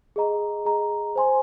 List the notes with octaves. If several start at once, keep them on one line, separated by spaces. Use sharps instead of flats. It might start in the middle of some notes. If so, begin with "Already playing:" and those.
G#4 D#5 A#5
G#4 D#5 A#5
C5 G#5 C6